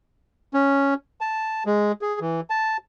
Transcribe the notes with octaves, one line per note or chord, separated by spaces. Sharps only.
C#4
A5
G#3
G#4
E3
A5